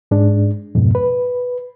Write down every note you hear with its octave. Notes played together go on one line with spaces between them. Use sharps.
G#2 G#3 D4
F2 G#2 B2
B4